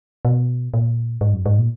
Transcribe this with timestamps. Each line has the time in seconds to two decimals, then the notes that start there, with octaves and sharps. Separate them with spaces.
0.25 B2
0.74 A#2
1.21 G#2
1.33 F#2
1.46 G#2
1.58 A#2